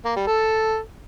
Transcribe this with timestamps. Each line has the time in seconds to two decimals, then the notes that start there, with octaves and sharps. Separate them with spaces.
0.05 A#3
0.16 G3
0.27 A4